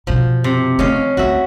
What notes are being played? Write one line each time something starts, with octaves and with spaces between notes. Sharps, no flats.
F#2 B2 F3
C3
A3 C#4 D#4 D#5 F5
D2 B3 F#4 E5